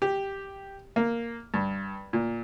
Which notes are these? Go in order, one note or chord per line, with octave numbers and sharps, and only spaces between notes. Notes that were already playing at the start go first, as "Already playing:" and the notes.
G4
A#3
G2
A#2